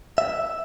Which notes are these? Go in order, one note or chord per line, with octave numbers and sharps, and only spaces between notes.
E5